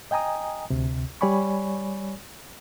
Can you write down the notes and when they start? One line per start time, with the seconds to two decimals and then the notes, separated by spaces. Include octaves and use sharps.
0.11 D#5 G5 G#5 A#5 D#6
0.70 D2 C3
1.21 G3 C#5 D5 G#5 B5 C#6